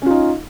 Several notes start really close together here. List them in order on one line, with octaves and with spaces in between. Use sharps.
C#4 F4 D#4